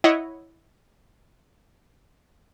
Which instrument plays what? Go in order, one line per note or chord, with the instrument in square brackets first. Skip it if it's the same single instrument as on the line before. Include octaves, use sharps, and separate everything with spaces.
[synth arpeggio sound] E4 C#5 D#5 F#5